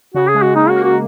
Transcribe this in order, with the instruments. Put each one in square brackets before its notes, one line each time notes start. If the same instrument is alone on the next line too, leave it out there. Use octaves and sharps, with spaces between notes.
[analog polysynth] C#3 [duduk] F#4
[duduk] G#4
[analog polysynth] G#3
[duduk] F#4
[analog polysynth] A#3 [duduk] D#4
[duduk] F#4
[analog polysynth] A#3
[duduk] F#4